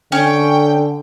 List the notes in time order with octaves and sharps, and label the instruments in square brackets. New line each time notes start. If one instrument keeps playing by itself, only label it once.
[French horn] D3 [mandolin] C#4 [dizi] G5